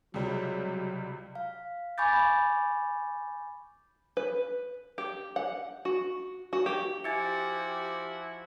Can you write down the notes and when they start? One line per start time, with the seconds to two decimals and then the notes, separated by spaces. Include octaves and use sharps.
0.14 C#2 C3 F#3 G3
1.35 F5
1.98 G#5 B5 C#6 D6 G6 A6
4.17 B4
4.98 G4
5.36 F#5
5.85 F#4
6.53 F#4
6.66 G4
7.04 F3 E4 F#4 G4 G#5 A6 C#7